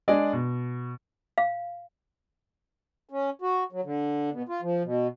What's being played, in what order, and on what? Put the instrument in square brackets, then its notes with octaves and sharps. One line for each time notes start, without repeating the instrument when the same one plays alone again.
[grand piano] G#3 D4 G#4 D5 D#5
B2
[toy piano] F5
[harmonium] C#4
F#4
F#3
D3
B2
F4
F3
B2